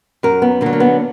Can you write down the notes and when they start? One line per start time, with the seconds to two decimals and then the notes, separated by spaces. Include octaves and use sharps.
0.23 F#2 A#4
0.42 B3
0.61 D3 A#3
0.66 F#3
0.73 A#3
0.80 B3